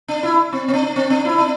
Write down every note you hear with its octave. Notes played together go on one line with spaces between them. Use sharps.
D4
E4
C4
C4
D4
C4
D4
E4
D4